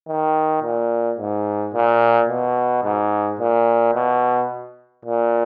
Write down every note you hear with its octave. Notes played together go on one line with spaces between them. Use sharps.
D#3
A#2
G#2
A#2
B2
G#2
A#2
B2
A#2